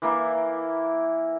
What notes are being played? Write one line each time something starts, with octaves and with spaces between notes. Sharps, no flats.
E3 A#3 E4